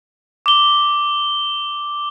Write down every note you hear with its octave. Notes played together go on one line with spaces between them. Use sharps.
D6 G7